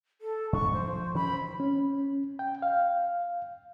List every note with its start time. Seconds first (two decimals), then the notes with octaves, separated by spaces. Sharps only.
0.21 A4
0.53 F2 G#2 D4 C#6
0.73 F3 C5
1.15 D#3 F3 C#4 B5
1.60 C#4
2.39 G5
2.62 F5